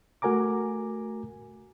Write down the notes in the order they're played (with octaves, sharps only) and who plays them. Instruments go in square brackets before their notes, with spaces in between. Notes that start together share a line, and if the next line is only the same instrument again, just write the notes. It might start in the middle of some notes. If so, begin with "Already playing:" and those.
[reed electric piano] A3 F#4 A#4 G#5 A#5 D6